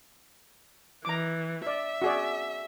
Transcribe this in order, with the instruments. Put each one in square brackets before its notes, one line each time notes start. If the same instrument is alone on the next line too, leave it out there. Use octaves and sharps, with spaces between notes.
[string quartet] E3 [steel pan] A#5 D6
[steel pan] D5 [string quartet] E5
[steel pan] F#4 G#4 D5